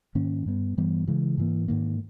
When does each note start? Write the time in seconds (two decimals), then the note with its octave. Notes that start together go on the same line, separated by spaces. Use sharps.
0.15 G#2 D#3 A#3 C#4
0.46 G2 G3 B3
0.77 G2 E3 G3 B3
1.07 C#3 E3 G#3
1.38 G#2 E3 A#3
1.68 G#2 D#3 A#3